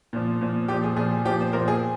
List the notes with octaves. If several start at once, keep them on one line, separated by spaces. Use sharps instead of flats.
A#2 F3
A#2 F3
A#2 F3 G4
G#4
A#2 F3 G#4
A#2 F3 G4
C5
A#2 F3 A#4
G#4